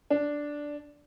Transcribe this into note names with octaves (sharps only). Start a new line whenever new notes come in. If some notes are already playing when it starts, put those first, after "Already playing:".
D4